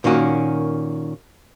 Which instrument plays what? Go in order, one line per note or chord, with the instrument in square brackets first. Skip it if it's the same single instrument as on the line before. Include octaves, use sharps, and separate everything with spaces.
[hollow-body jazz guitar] A#2 D#3 A#3 C#4 F#4